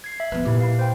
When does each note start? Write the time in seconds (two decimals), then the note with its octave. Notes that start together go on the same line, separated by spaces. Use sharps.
0.04 G#6 C7
0.20 E5
0.32 F3 B3 B4
0.45 A#2 E4 G4
0.60 E4 F5
0.79 C5 G5